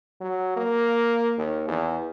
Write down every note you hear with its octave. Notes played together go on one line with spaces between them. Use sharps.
F#3
A#3
D#2
E2